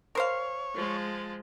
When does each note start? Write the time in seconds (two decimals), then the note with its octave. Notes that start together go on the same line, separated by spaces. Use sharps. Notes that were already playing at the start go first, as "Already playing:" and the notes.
0.15 A#4 C5 C#5 F5
0.74 F3 G#3